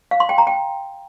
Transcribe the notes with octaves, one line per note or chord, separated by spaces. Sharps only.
F5
C6
G5
A#5
G5